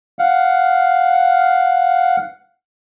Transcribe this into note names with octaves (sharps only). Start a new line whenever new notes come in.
F5 F#5